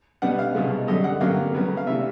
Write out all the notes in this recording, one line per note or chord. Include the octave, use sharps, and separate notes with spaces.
B2 G3 B3 D4 F#5
F5
C2 B2 G#3
F#2 D3 G3 D#5
F#5
G2 D3 F#3 A#3 F5
C#2 C#3 F#3 B3
F5
C3 E3 A3 D4 E5